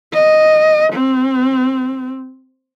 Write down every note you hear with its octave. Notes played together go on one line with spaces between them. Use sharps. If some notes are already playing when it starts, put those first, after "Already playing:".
D#5
C4